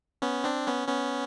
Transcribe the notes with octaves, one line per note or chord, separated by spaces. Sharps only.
B3 C#4
C4 D4
B3 C#4
B3 C#4